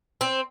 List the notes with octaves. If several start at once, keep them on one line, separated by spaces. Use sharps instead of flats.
C4